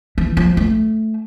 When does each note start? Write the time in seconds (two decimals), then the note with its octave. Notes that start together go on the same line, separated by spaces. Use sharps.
0.18 E3
0.37 F3
0.57 A3